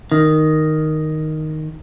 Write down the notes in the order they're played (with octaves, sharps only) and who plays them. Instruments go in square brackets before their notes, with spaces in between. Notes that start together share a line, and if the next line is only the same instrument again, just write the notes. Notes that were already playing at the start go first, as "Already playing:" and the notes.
[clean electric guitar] D#3